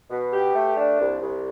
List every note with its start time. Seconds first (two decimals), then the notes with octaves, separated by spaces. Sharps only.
0.10 B2
0.33 G4
0.55 A3
0.77 D4
1.00 C2
1.22 C2